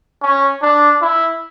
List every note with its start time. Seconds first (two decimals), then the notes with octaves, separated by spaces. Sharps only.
0.22 C#4
0.62 D4
1.01 E4